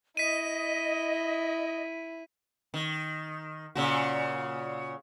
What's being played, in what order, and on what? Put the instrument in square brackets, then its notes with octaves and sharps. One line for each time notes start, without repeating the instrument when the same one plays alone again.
[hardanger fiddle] E4 [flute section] D#5 [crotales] B6 D#7
[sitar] D#3
A#2 C#3 F#4